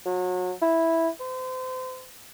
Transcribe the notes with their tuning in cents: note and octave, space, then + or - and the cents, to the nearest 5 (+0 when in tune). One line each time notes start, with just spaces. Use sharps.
F#3 -30
E4 -5
C5 -35